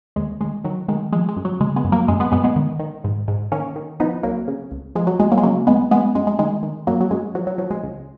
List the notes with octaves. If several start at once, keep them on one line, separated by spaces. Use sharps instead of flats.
D#2 G#3
D#2 G#3
D#3 F#3
D#3 G#3
F3 G#3
G#3
F#2
F#3
C#3 G#3
G#3 B3
F#2
F#3 A#3
F#2 G#3
G#3 B3
F#2 G#3 B3
G#3 B3
D#3
D#3
G#2
G#2
D#3 A#3 C#4
D#3
F3 B3 D#4
C#2 F#3 A#3
C#3
C#2
F3 G#3
F#3
D#2 G#3
F#3 A#3
G#3
C#3 F#3 A#3
D#2 G#3 B3
F#2 G#3 B3
F#2 G#3
G#3
D#3 G#3
D#3
F#2 F#3 A#3
F#3
F#2 G#3
F3 F#3
F#3
F3 F#3
G#3
C#2